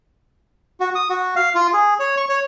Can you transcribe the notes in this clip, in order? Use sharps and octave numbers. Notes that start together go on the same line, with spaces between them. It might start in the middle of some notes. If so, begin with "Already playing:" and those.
F#4
D#6
F#4
F5
F4
G#4
C#5
C#6
C#5